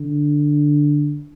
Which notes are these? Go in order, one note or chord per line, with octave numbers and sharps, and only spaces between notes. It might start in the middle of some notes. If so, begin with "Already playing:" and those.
Already playing: D3